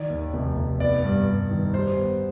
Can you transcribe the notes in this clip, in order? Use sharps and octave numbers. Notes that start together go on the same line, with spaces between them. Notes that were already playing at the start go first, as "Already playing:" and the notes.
Already playing: D#3 D5
D#2
F1
F1
B3 D5
G2
G2
D#3
G3 C5
B3